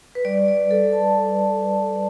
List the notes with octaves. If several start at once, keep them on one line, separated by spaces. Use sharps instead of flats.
B4
G3 D5
D5
G3
A4
G3 A5